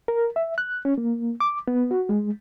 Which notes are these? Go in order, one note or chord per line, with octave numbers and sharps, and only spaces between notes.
A#4
E5
F#6
C#4
A#3
D6
B3
F#4
G#3